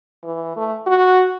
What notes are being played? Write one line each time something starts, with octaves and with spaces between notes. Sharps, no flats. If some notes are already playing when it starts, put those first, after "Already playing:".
E3
A3
F#4